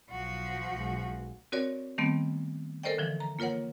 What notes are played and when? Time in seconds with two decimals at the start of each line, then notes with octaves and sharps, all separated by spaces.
0.10 B1 F3 F#4
0.71 B1 G#3
1.52 C4 F#4 A#4 C#5 D5
1.98 D#3 G3 A3 B3 C4
2.83 A4 A#4 C5 D5 D#5 G5
2.98 D3 E3 F3
3.20 A#5
3.39 A#3 F4 A#4 C#5 F#5